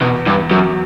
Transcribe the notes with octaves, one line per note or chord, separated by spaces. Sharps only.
E2 B2
E2 G2
F#2 F#3